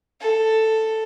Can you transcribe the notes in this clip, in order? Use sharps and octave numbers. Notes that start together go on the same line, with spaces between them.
A4